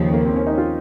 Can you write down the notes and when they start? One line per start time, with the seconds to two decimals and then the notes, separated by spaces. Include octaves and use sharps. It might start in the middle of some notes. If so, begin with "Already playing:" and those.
Already playing: D#2 C#3 F3 G4
0.13 A#3
0.25 C4
0.36 C#4
0.47 D#4
0.58 F4